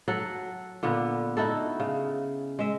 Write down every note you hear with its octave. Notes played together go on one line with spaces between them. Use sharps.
F#3 A4 F#5
A#2 D3 B3
D#4 E4 F#4 A4
C#3
G#3 E5